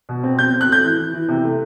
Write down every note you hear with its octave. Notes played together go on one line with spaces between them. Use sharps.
B2
C4
C4 G6
C4
F#6
A3 G6
E3
E3
E3
C3
A3